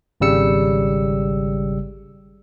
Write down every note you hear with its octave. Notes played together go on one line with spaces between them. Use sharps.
G#1 C#3 G3 E6 C#7